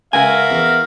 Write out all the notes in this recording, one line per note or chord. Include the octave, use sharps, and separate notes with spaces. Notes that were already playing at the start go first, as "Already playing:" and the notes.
C#2 F#4 A#4 E5 F5 G#5
E2